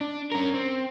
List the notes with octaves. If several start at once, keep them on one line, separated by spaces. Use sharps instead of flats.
D4
C#4 A#4
C4